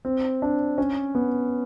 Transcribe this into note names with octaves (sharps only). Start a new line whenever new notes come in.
C4
D4
C#4
B3